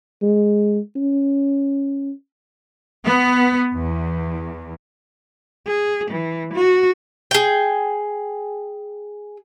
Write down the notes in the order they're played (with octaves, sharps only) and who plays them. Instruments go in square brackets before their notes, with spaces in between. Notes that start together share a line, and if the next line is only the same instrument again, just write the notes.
[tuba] G#3
C#4
[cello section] B3
E2
[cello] G#4
E3
F#4
[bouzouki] G#4 G5